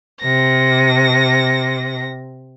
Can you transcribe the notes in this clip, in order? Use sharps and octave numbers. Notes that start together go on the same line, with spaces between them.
C3 A#6